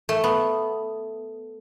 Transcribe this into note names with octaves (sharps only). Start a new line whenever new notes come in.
A3
B3